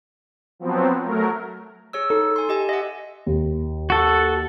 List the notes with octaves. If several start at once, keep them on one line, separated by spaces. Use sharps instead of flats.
F3 F#3 B3 C4
F#3 A3 A#4
G#4 C#5 E6
D#4 A4
G#5 C6
G4 D#5 G#5
D#5 E5 F#5
D#2
F#4 A4